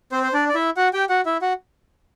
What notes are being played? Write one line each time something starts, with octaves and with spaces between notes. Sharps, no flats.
C4 C5
C5
D4 D5
D5
E4 E5
F#4 F#5
G4 G5
F#4 F#5
E4 E5
F#4 F#5